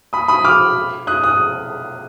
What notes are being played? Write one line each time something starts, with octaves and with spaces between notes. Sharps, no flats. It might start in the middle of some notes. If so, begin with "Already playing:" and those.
B5 D#6
B5 D#6
D6 F6
D#6 F#6
D#6 F#6